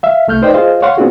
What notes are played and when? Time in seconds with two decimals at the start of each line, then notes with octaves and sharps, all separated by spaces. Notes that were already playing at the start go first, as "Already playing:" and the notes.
0.03 E5 F5
0.27 C2 A3 F6 G6
0.42 D#4 B4 C5 D5 D#5 G5
0.54 F4 G#4 C5 D#5 F5
0.82 C#5 F5 F#5 C6 C#6
0.97 B3 C4 D4 F4 F#4 G#4